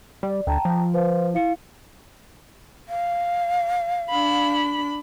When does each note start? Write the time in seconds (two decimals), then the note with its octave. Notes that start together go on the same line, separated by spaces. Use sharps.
0.23 G3 D5
0.47 D2 G5 A5 A#5
0.65 F3
0.94 B4 C5 F5
1.34 E4 F5 C#7
2.89 F5
4.10 D4 B5